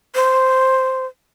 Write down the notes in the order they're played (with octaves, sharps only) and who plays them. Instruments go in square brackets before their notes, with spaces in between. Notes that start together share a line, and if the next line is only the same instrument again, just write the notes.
[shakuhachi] C5